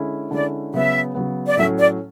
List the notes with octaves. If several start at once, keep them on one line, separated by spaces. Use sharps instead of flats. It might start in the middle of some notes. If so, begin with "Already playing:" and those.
Already playing: D3 G#3 C#4 E4
D3 G#3 C#4 E4 D5
C#3 F#3 B3 E5
C#3 F#3 B3
D5
A2 F#3 A3 C#4 E5
D5